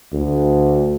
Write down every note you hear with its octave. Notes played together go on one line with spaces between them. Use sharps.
D2